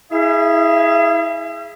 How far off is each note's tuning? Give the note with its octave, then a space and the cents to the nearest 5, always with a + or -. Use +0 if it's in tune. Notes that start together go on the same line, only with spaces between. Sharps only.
E4 -20 G#4 +0 E5 +45